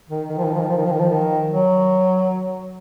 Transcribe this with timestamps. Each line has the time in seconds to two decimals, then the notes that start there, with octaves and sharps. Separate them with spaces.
0.10 D#3
0.29 D#3
0.38 F3
0.46 D#3
0.54 F3
0.61 D#3
0.69 F3
0.77 D#3
0.85 F3
0.92 D#3
1.00 F3
1.09 D#3
1.50 F#3